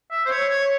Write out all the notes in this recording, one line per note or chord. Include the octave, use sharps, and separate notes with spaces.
E5
C5
C#5
C#5